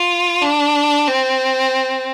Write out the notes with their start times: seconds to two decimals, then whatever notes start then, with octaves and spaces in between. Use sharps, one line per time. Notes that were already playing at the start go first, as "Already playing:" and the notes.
Already playing: F4
0.41 D4
1.07 C4